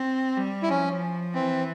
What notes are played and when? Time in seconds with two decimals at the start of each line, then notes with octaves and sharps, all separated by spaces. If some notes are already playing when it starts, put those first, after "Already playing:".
Already playing: C4
0.37 G3
0.62 E4
0.69 F3 C#4
1.34 E3 C4